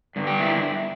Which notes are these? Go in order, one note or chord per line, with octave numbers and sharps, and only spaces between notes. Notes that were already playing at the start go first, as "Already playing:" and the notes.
G2 D3
G4
E4